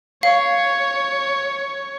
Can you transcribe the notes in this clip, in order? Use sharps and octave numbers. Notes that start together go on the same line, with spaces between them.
C#5 F5